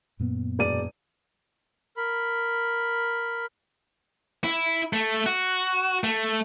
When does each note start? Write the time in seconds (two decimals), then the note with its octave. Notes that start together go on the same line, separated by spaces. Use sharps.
0.20 F#2 A#2 B3
0.59 E1 D5 D#7
1.97 A#4 B5
4.44 E4
4.93 A3
5.26 F#4
6.04 A3